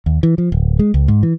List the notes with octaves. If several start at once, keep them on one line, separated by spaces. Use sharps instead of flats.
D#2
E3
F3
D1
G#3
C#2
G#2
E3